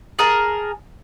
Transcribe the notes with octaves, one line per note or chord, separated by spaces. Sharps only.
G#4 A#4 A5